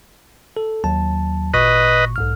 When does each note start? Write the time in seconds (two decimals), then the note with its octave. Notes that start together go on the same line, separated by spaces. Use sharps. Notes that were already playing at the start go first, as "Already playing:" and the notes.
0.57 A4
0.84 D#2 F#3 A5
1.54 G#1 A#2 B4 D#5 C#6
2.16 B1 G#2 F6